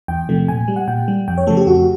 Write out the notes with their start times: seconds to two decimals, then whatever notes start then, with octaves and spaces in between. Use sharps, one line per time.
0.08 E2 G5
0.29 C3 F3 A3
0.48 A#2 G#5
0.68 G3
0.76 F#5
0.88 A#2 G5
1.08 G3
1.28 F2 G5
1.38 C#5
1.47 C#3 F3 A3 A4
1.57 G4
1.67 F2 F#4